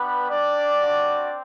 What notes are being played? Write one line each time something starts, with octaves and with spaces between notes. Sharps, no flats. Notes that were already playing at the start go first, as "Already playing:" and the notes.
Already playing: G3 B3 D4 G4 B4
D4 D5
C4 F#4